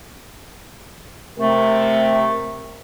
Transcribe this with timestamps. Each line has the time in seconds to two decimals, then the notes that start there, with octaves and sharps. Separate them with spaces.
1.39 C3 A3 A#4